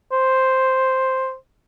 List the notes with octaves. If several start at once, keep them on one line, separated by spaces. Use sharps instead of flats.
C5